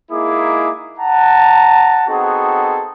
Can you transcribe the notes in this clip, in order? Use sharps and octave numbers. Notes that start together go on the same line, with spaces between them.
G#3 A#3 D#4 E4 G#4 D6
F#5 A5 A#5
B3 C4 D#4 F#4 G#4 A4